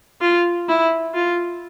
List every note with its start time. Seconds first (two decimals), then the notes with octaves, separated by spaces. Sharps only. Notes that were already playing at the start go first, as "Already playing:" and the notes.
0.21 F4
0.68 E4
1.15 F4